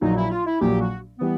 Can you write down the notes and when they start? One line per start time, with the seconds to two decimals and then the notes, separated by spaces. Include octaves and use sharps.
0.01 A#1 A#2 F#3 D#4
0.16 E4
0.31 F4
0.46 E4
0.60 A#1 A#2 F#3 G4
0.80 F#4
1.19 E3 G3 B3